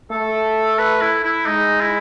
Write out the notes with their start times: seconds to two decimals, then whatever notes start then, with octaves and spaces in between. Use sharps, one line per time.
0.11 A3 A4
0.79 B4
1.02 E4
1.24 E4
1.46 G#3 D#4
1.81 E4